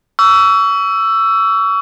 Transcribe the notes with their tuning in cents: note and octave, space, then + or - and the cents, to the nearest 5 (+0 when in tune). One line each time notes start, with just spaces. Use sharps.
C#6 +35 E6 +15